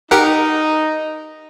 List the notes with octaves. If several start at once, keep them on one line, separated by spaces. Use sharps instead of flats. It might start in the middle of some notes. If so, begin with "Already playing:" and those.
D#4 G4 A#4 F#5